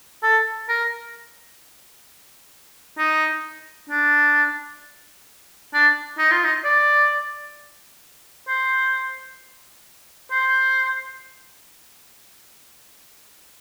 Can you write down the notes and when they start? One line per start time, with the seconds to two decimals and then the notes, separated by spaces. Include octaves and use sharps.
0.23 A4
0.68 A#4
2.98 D#4
3.89 D4
5.73 D4
6.18 D#4
6.31 F4
6.44 D#4
6.65 D5
8.48 C5
10.31 C5